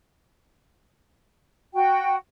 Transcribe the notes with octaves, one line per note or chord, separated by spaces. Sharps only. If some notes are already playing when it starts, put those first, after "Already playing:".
F#4 G5